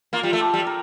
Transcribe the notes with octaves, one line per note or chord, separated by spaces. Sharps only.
A#3 F4
G3
A3
G4
G3
A#4